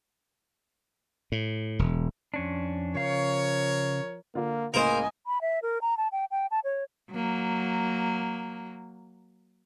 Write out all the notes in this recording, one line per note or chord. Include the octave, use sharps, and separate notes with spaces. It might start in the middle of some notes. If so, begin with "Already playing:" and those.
A2
E1
F2 C#4 D4
C#3 F3 A#4 C#5 F5
D3 A#3 F4
C#2 A2 A#3 A#4 C5 D#5 G#5 E7
B5
E5
A#4
A#5
A5
G5
G5
A5
C#5
F#3 A#3